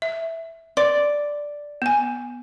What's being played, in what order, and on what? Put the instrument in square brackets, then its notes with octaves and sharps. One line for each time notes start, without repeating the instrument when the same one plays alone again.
[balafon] E5
[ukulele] D5 [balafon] C6
[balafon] B3 G#5